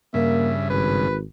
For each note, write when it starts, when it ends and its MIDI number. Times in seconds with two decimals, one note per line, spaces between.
0.14 1.08 43
0.14 1.08 49
0.14 0.52 58
0.14 0.67 76
0.70 1.24 32
0.70 1.17 71